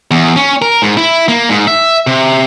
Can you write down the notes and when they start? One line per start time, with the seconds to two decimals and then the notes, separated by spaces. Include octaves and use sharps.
0.11 E2
0.36 C#4
0.62 A#4
0.82 G#2
0.97 E4
1.28 A#3
1.49 G#2
1.67 E5
2.07 C3